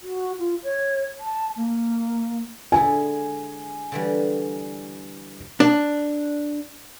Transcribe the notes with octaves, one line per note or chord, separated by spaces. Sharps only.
F#4
F4
C#5
A5
A#3
D3 G#3 E4 G#5
D3 E3 G3
D4